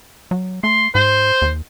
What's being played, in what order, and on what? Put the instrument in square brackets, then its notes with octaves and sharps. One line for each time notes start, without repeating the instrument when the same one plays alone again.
[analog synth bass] F#3
[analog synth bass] A3 [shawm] C6
[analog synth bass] G#2 [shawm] C5
[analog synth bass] D#2